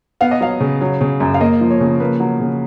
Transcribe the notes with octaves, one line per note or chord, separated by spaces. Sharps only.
B3 F5
D#5
F#3 F5
C#3
F#3
C#3
F#2
F5
A#3 D#5
F3
C#5
C#3
A#3 B4
F#3
C#3